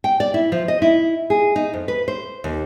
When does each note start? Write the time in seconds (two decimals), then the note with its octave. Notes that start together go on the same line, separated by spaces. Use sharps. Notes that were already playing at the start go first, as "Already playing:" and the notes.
0.04 G5
0.20 D5
0.34 E4
0.52 F3
0.68 D#5
0.82 E4
1.30 G#4
1.56 D#4
1.73 F2
1.88 B4
2.08 C5
2.44 D#2